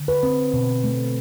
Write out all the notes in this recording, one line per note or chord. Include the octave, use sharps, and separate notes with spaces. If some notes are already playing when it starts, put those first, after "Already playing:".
Already playing: D3
B4
C4
B2
A3